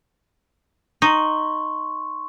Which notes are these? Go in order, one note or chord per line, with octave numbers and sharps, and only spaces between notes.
D#4 C6 C#6